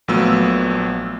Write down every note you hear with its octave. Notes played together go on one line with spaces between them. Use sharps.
A#1 A#2 F#3 A3 B3 E6